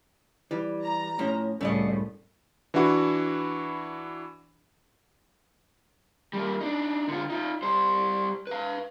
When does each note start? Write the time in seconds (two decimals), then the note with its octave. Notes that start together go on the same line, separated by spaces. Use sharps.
0.51 E3 G3
0.83 A#5
1.19 A2 F3 C#4
1.61 C2 A2 C#3 A3 D5 D#5
2.74 E3 D4 E4 F#4
6.33 G3 A#3
6.60 D4 D#4
7.08 D3 F4
7.30 D#4 F4
7.63 G3 C5
8.47 B4 F5